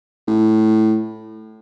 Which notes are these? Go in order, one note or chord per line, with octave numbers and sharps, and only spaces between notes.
A2